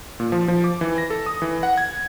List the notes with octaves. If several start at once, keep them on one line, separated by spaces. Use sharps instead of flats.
A#2
F3
F3
D6
E3
A#6
A4
D#6
E3
F#5
G#6